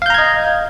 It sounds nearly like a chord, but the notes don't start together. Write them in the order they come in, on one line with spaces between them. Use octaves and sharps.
F5 G6 A#5 G#6 D#5